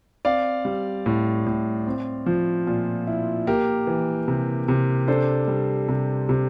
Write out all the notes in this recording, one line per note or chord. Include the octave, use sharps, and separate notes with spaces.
C4 D5 F5
G3
A2
A2
C4
F3
A#2
E4
A#3 G4 A#4
E3
C3
C3
D4 A4 C5
G3
C3
C3